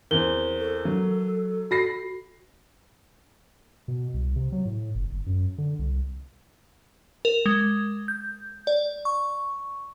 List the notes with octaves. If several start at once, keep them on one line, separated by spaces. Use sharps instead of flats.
E2 C4 A#4 G7
A4
F#3
F#4 B5 A#6 C7
B2
C2
C3
F#3
A2
F#1
G1
F#2
D3
C2
A#4
G#3
G6
D5
C#6